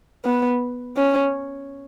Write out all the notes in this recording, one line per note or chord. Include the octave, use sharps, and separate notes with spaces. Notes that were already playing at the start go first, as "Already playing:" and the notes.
B3
C#4